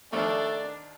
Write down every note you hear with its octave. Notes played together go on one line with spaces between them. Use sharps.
D#2 F3 A3 D4 D5